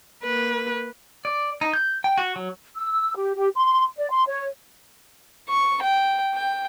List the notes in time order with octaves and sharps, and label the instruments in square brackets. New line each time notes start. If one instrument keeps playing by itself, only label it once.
[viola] A#3 B4
[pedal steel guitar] D5
D#4
G6
G5
F#4
F#3
[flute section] E6
G4
G4
C6
D5
C6
C#5
[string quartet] C#6
G5
G5